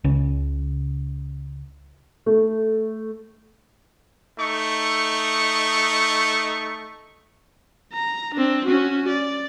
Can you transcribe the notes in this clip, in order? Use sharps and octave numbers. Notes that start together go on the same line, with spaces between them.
C#2 C#3
A3
A3 D#4 C#6
A#5
C4 D4
C#4 F#4
D5